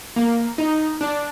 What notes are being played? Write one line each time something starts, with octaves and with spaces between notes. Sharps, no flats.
A#3
D#4
D4